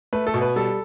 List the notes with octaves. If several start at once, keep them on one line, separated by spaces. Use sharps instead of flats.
A3 B4
A4
B2
B4
G3 A4